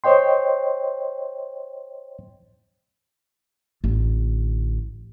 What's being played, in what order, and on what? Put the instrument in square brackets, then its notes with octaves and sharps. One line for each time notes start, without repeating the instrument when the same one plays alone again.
[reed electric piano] C5 C#5 D#5 G5 C6
[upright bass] A1 D3